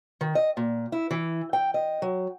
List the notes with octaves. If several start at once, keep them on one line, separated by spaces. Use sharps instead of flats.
D#3
D#5
A#2
E4
E3
G5
D#5
F#3